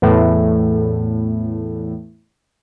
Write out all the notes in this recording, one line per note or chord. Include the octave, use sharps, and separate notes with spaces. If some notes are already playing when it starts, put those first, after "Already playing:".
E2 A2